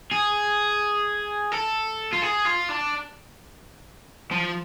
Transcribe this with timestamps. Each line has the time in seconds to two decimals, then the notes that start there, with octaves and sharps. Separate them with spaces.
0.12 G#4
1.52 A4
2.13 F4
2.22 G#4
2.45 F4
2.69 D4
4.32 F3